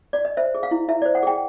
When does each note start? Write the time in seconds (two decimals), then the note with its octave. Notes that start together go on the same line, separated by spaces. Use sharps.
0.13 D5
0.25 D#5
0.37 C5 E5
0.55 G#4
0.63 F5
0.71 E4
0.88 E4 E5
1.02 D5
1.06 C5
1.15 F#5
1.23 G#4 G5